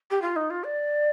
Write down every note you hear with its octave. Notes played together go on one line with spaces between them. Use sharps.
G4
F4
D#4
F4
D5